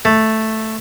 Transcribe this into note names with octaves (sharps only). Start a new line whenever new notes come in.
A3